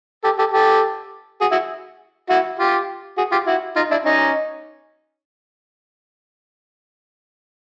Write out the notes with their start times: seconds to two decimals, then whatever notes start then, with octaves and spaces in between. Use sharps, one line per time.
0.24 G4 A4
0.39 G4 A4
0.53 G4 A4
1.41 F#4 G#4
1.51 E4 F#4
2.29 E4 F#4
2.59 F4 G4
3.18 F#4 G#4
3.32 F4 G4
3.47 E4 F#4
3.76 D#4 F4
3.91 D4 E4
4.05 C#4 D#4